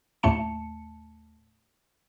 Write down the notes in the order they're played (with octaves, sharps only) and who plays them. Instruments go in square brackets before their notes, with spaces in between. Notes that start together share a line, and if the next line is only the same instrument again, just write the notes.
[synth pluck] D#2 A2 A3 A5 C#7